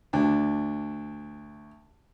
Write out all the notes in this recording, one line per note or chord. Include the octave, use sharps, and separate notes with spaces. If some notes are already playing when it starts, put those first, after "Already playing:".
D2 D4